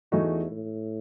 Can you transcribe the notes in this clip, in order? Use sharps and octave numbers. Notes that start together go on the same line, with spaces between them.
E2 E3 A3 D#4 F#4
A2